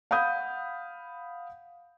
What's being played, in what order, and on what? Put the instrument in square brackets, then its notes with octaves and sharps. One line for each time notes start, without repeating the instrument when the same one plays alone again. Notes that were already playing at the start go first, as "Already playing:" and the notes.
[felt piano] F5 F#5 B5 D#6 G6